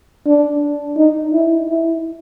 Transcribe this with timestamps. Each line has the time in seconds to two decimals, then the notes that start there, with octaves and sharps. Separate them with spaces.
0.26 D4
0.97 D#4
1.33 E4
1.69 E4